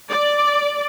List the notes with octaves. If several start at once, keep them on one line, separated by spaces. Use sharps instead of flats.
D5